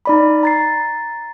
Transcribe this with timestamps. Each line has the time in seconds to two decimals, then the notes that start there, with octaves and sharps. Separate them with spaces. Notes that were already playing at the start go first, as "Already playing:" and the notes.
0.05 D#4 D5 B5
0.43 A#5 A6 C7